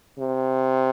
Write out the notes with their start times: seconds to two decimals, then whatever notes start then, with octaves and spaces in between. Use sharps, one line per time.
0.18 C3